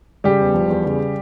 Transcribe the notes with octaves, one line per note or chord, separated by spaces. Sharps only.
C#3 G3 G4
E1
F3
E2
C#3